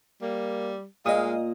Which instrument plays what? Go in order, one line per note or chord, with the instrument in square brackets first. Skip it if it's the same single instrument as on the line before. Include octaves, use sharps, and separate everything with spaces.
[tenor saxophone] G3 [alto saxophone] A#3
[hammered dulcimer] A#2 [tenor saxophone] G#3 [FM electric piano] D#5 D#6 [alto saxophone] F5